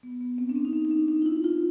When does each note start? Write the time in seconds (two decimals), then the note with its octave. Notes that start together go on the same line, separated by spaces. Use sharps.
0.03 B3
0.21 B3
0.38 C4
0.49 D4
0.55 C#4
0.65 D#4
0.73 D4
0.85 D#4
0.91 D4
1.08 D#4
1.22 F4
1.26 E4
1.44 F4